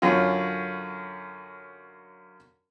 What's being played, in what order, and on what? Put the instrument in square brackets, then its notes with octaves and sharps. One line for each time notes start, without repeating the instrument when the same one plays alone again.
[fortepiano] F#2 D3 C#4 F4